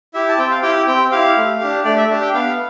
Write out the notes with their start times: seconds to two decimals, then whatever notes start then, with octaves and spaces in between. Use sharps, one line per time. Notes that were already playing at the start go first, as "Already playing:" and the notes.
0.14 E4 G4 E5
0.29 A5
0.38 C4 G5
0.51 F5
0.62 E4 G4 G5
0.87 C4 G5
1.11 E4 G4 F5
1.37 A3
1.60 D4 G4
1.85 A3 D5
1.97 E5
2.09 D4 G4
2.22 G5
2.34 B3 F5